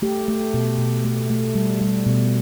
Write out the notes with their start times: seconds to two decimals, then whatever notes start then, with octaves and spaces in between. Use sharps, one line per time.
0.02 A3 G4
0.28 A3
0.54 B2
0.78 B2
1.05 A3
1.30 A3
1.55 G3
1.81 G3
2.06 B2